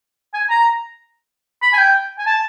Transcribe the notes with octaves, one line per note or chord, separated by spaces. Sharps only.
G#5
A#5
B5
G#5
G5
G#5
A5